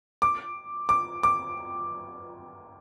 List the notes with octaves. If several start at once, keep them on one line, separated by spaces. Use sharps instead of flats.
D6
D6
D6